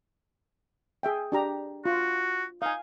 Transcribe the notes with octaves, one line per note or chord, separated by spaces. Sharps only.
G#4 E5 G5
D4 G4 A#5
F4 F#4
D#4 F5 G#5